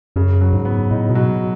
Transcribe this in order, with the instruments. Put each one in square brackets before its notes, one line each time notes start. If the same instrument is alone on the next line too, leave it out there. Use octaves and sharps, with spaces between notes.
[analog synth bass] F#2 [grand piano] C#3
[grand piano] F#3
[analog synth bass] G#2
[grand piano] B3
[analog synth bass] A2 [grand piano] D#4
[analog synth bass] B2
[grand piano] F#3